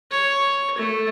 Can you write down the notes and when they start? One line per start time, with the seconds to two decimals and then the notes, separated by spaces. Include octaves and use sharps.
0.12 C#5
0.78 A3